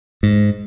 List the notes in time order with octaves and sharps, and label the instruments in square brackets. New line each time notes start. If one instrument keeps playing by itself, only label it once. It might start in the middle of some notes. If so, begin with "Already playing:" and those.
[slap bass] G#2